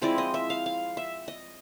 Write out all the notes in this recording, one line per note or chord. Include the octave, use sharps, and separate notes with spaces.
F3 G#3 C4 E4 D5
D#5
E5
F5
F5
E5
D#5